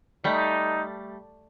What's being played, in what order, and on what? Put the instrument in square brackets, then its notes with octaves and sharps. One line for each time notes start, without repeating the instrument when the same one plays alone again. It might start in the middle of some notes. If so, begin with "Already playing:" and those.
[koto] G3 A3 [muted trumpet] D#4